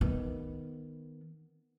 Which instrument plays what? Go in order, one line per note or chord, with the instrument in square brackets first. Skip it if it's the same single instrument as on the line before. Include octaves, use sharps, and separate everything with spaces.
[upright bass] D#3 B3